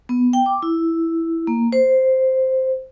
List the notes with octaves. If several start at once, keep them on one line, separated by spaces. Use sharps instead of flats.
B3
G5
D6
E4
A#3
C5